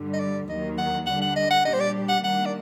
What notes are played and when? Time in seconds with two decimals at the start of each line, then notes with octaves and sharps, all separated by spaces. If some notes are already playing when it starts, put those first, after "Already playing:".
Already playing: G2 D3 G3
0.13 D#5
0.20 D5
0.48 D#2 D#3 F#3 A#3 D#5
0.78 F#5
1.06 D3 G3 D4 F#5
1.22 F#5
1.36 D#5
1.51 F#5
1.65 A#2 G3 D4 G4 D#5
1.73 C5
1.80 D5
2.08 F#5
2.23 D#3 G3 A#3 D4 F#5
2.46 D5